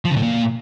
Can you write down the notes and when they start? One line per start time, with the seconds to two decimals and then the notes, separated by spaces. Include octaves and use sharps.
0.05 F3
0.11 C#3
0.17 A2
0.22 A#2